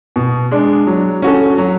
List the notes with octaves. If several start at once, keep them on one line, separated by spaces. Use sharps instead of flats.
B2
G#3 D4
F#3
C#4 F#4 A4
F#3